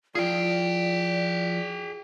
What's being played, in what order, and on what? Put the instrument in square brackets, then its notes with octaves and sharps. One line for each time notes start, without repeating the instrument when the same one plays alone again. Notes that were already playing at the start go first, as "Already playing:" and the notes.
[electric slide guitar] F3 E4 F4 [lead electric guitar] G#4 G5 [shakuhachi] D5